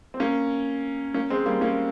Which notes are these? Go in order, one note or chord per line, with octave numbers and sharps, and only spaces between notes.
C4
A#3 C#4
A#3 C#4
G#3 C4
G3 A#3
A#3 C#4